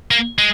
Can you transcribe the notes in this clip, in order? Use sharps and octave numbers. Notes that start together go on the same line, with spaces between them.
A#3
G#3